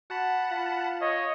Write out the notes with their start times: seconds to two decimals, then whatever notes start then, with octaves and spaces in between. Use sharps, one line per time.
0.10 F#4 F#5 A5 B5
0.51 F4
1.01 C#5 D#5